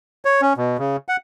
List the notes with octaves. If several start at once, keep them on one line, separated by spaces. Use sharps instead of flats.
C#5
C#4
B2
C#3
F#5